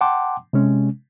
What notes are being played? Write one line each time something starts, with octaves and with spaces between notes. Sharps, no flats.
F#5 G5 A5 C6 D6
C3 G#3 C#4